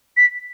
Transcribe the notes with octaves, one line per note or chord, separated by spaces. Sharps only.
B6